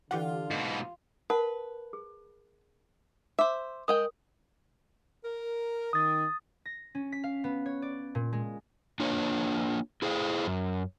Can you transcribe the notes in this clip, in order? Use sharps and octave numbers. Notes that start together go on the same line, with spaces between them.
D3 E3 F4 G4 F#5
G#2 B2
A#4 B4 F#5 A5
G#4
C5 E5 D6
G#3 A#4 D#5 G5 D#6
A#4
D#3 D#6 A6
A#6
C#4
B6
F5
B3
C#5
D5
A#2
G#3
A#3 D4 F4 C#5
E4 G#4 C5 F5
F#2